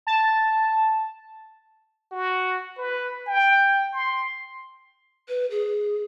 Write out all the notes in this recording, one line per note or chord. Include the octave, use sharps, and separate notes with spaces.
A5
F#4
B4
G5
C6
B4
G#4